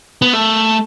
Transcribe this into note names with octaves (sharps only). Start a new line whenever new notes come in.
B3
A3